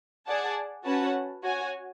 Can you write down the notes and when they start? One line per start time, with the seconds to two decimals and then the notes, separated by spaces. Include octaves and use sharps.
0.27 G#4 D5 F#5 A5
0.85 C#4 F#4 B4 F#5 A5
1.43 F#4 C#5 G#5